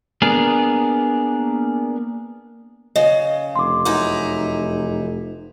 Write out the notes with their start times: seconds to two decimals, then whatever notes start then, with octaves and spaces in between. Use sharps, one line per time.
0.22 A#3 B3 D4 G#4 A#4
2.96 C#3 D#5
3.56 F1 C6 D6
3.85 F#2 D#4 E4